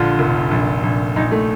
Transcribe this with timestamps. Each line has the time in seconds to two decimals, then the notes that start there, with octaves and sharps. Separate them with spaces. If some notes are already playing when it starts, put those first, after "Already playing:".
Already playing: A#1 D3 F4
0.19 F1
0.51 A#1
0.83 A#1
1.16 A#1 D#4
1.32 A3